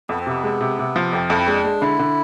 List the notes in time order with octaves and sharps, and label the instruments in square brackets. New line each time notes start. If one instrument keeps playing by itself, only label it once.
[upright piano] F2 [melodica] B3
[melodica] C4
[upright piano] C3 [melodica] B3
[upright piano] G#3
C3
C3
F3
[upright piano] F2 [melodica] C4
[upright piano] F2
[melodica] E4
[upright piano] G#3 [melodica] D4
[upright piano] G#3
[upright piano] D3 [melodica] E4
[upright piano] D3